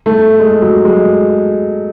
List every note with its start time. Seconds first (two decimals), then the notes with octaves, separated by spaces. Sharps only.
0.06 A3
0.40 G#3
0.62 F#3
0.85 G#3